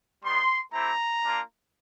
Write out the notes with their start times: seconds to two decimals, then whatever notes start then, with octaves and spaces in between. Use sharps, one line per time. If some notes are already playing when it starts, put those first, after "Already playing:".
0.24 G3 B3 D#4 C6
0.73 A3 C4 E4 G4 A#5
1.24 A#3 D4 F4